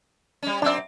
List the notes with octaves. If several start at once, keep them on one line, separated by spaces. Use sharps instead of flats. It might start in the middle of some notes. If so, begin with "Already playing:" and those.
G3 C#4
F#2 C4 D4 D5 E5